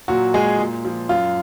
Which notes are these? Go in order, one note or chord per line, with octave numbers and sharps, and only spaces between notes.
A#2 F#3 F#4
F#3 G#3 G#4
A#2
F3
F#2 F4